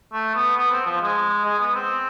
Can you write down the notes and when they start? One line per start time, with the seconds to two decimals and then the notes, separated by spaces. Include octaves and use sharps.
0.13 A3
0.35 B3
0.57 B3
0.72 C4
0.86 F3
1.01 G#3
1.45 G#3
1.60 B3
1.75 C4